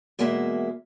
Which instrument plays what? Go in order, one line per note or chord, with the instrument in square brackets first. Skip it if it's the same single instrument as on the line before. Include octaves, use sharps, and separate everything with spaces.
[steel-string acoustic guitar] E2 B2 G#3 A#3 E4 E5